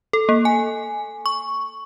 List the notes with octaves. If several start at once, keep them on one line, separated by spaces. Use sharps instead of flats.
A4
A#3
G#5
C#6